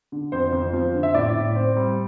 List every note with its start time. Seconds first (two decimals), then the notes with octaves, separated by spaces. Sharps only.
0.12 D3
0.32 F2 C5
0.53 F2
0.73 F3
0.94 D3
1.03 E5
1.14 A2 D5
1.35 A2
1.56 C4
1.77 G3